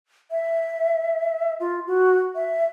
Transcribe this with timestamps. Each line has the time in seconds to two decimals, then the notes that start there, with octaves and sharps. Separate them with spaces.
0.31 E5
1.60 F4
1.87 F#4
2.35 E5